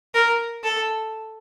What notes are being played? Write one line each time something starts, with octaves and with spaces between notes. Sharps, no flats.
A#4
A4